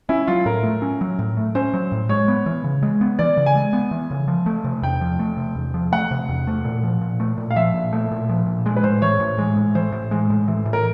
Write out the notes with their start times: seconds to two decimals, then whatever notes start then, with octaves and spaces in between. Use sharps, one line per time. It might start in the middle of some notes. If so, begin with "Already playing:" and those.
0.09 C#4 E4
0.28 F#3 F4
0.46 A2 A#4
0.63 A3
0.82 C#4
1.01 F#3
1.19 A2
1.37 A3
1.55 C#4 C5
1.74 F#3
1.92 A2
2.09 G#3 C#5
2.28 B3
2.46 E3
2.64 C#3
2.83 G#3
3.01 B3
3.19 E3 D5
3.37 C#3
3.46 G#5
3.55 G#3
3.73 B3
3.91 E3
4.11 C#3
4.28 F3
4.46 A3
4.64 C3
4.82 E2 G5
5.01 F3
5.19 A3
5.37 C3
5.55 E2
5.74 F3
5.92 A3 F#5
6.11 C3
6.29 E2
6.47 A3
6.65 A#2
6.83 F3
7.01 A#2
7.20 A3
7.38 A#2
7.51 F5
7.56 F3 E5
7.74 A#2
7.93 A3
8.11 A#2
8.29 F3
8.47 A#2
8.66 G#3
8.76 B4
8.84 A2 C5
9.02 E3 C#5
9.20 A2
9.38 G#3
9.56 A2
9.75 E3 C5
9.92 A2
10.11 G#3
10.30 A2
10.48 E3
10.66 A2
10.73 A#4